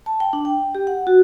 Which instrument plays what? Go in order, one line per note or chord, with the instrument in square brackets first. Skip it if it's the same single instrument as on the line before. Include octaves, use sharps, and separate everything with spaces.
[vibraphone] A5
G5
D4
G5
G4
F#5
F#4